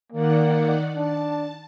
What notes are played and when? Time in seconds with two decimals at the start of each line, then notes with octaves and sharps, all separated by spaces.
0.12 D#3 A#3 D5 F#5
0.96 D4 A5